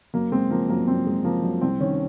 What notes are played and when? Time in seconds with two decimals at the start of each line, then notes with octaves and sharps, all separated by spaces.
0.14 F#2 A#3
0.32 G#3 C4
0.51 F3 A#3
0.69 F#2 A#3
0.87 F#2 C4
1.07 G#3
1.25 F3 A#3
1.43 F#2
1.61 C2 C4
1.80 D#3 C#4